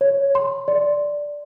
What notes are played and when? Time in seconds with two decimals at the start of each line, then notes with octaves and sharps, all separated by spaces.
0.01 C#5
0.35 C6
0.68 D5